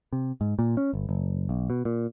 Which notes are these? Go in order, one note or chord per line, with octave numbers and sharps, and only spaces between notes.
C3
G#2
A#2
C#4
G1
F#1
B1
B2
A#2